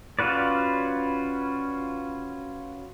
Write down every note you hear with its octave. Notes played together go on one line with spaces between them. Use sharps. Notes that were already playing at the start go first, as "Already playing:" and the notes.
C#4 F4 F#4 B4 D5